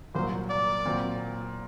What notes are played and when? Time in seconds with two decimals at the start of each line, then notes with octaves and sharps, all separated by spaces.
0.15 C2 A#2 F#3 A#3 C5
0.50 D5
0.85 A#2 F#3 C4